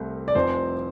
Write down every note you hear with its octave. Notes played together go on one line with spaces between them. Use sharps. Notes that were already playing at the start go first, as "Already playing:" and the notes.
Already playing: C2 C3 A3 C4
D5
F1 F2 F3 C4 C5